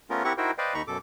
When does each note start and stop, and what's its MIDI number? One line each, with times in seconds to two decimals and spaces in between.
0.10 0.24 57
0.10 0.24 59
0.10 0.24 61
0.10 0.24 65
0.10 0.24 70
0.24 0.33 60
0.24 0.33 64
0.24 0.33 67
0.24 0.33 70
0.24 0.33 78
0.24 0.33 85
0.38 0.51 63
0.38 0.51 64
0.38 0.51 66
0.38 0.51 70
0.38 0.51 72
0.38 0.51 79
0.58 0.74 71
0.58 0.74 72
0.58 0.74 74
0.58 0.74 75
0.58 0.74 77
0.58 0.74 79
0.74 0.82 39
0.74 0.82 51
0.74 0.82 63
0.74 0.82 82
0.74 0.82 83
0.74 0.82 85
0.87 0.98 42
0.87 0.98 47
0.87 0.98 69
0.87 0.98 86